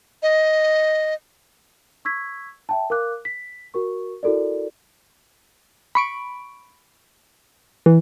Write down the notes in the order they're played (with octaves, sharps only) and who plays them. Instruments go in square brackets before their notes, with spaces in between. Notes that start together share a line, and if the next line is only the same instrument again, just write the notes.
[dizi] D#5
[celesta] C#6 E6 G#6 B6
E5 G5 A5
A#4 F5 D6 F#6
B6
F#4 A#4 C#6
E4 F#4 A4 A#4 D5
[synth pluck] B5 C#6 D7
E3